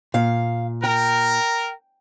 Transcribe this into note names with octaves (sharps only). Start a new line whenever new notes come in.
A#2 F5
A#4 G5